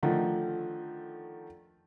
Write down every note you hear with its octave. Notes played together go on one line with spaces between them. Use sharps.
D3 D#3 F3 A3